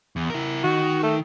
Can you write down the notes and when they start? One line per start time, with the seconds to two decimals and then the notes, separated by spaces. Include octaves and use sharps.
0.16 E2
0.30 E4 A#4
0.64 D#3 F#4
1.03 A3